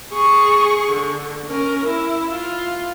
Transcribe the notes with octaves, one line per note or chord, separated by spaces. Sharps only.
G#4 C#6
D3
C#4 A#4
E4
F4